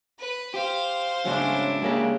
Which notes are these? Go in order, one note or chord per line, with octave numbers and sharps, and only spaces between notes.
B4
G4 C5 F5
G#2 C#3 F#3 C#4 D4 E4
C#3 G#3 A#3 G4